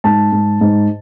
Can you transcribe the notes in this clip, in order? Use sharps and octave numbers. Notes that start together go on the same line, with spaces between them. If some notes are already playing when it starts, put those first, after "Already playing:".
G#2 A5
G#2
G#2